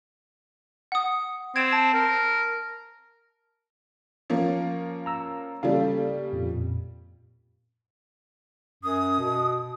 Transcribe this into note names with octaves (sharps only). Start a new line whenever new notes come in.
F#5 D#6
C4 G#6 D7 E7
A5
A#4
F3 A#3 C#4
A#5 E6
C#3 G3 A#3 A4 F5
F2 A#2
F#2 D#6
B2